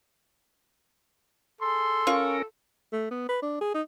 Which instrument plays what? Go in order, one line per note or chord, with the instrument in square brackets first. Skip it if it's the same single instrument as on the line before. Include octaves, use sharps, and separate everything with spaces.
[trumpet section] G#4 C6 [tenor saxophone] A4
[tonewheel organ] C#4 A#4 [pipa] F4 C#6
[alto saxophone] A3
B3
B4
D4
G#4
D#4